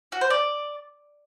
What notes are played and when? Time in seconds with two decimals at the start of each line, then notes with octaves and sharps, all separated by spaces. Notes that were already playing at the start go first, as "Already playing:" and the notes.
0.12 F#4
0.21 C5
0.30 D5